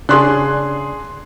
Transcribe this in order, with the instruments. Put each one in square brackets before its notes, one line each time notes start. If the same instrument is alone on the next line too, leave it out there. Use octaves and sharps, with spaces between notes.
[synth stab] C#3 D4 [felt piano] G#4 C6 F#6